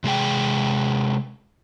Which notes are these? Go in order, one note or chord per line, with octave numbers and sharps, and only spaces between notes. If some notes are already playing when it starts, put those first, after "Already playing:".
C3 G#3 G#4 G5